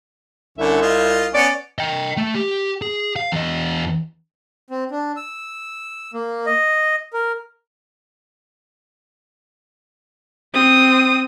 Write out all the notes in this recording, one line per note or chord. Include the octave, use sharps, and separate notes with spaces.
C2 D3 C#4 E5
F4 D#5
B3 C#4 D5
D#5 G5
A3
G4
G#4
F5
E2 D#5
C4
D4
E6
A#3
D#5
A#4
C4 D#6